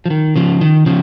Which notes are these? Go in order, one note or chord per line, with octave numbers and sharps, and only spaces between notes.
F3
D#3
C#3 F3
D#3
C#3 F3